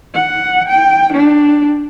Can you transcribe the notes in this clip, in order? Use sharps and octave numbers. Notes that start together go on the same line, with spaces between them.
F#5
G5
D4